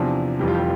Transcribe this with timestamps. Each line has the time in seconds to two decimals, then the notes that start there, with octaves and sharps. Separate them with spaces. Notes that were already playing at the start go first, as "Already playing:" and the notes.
Already playing: E2 C3 F3 D4
0.39 F1 F2 E3 G3
0.48 F4
0.55 G4